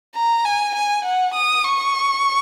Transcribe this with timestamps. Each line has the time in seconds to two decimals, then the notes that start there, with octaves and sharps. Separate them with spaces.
0.15 A#5
0.45 G#5
0.75 G#5
1.05 F#5
1.34 D#6
1.64 C#6